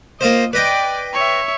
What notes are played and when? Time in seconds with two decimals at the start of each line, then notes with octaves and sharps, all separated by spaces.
0.21 A#3 F4 C5 D#5
0.53 B4 D5 D#5 G5
1.14 C#5 E5